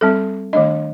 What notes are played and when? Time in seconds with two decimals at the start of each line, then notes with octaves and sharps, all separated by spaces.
0.01 G3 C4 A4
0.53 D#3 A3 D4 D#5